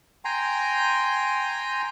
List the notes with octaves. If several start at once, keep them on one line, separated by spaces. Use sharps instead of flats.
G5 G#5 A#5 C6